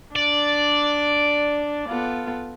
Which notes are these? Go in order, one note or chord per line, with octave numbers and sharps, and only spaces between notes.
D4 D5
B3 F4 A4